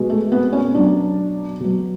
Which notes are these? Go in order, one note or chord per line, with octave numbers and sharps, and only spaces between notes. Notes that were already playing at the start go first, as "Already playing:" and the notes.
Already playing: B2 G#3
A3
B3
C#4
B2 F#3 D4
B2 F#3